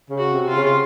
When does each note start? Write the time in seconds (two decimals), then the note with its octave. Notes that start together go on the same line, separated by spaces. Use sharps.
0.10 C#3
0.18 F#4
0.33 C3
0.48 F4
0.56 C#3